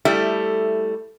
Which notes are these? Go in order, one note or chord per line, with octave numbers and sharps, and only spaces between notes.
G3 A3 E4